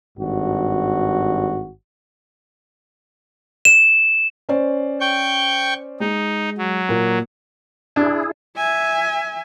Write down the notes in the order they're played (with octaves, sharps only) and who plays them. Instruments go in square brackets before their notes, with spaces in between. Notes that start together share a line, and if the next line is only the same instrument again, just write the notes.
[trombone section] G#1 G2 F#4
[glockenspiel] E7
[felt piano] C#4 C5 D5
[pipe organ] G5 C#6 G6
[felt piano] G#3 [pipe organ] D#4
[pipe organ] F#3
[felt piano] A#2 A#3
[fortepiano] D4 [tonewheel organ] E4 G#4
[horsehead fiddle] E5 G#5